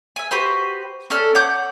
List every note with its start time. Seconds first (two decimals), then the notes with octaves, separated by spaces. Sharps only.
0.16 E5 G#5
0.31 F#4 G4 B4 C5
1.10 C#4 A4 D5 F6
1.35 C#5 F#5 D6 G6